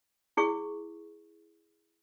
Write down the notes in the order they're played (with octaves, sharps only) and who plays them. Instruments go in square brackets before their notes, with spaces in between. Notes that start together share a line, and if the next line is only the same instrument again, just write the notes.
[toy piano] E4 G#4 C#6